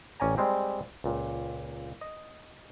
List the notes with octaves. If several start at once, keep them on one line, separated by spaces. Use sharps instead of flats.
A1 C#4 D5 G#5 A#5
G3 G#3 C4 G4
C#2 A#2
D#5